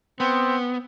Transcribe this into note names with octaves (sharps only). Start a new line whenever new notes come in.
B3 C4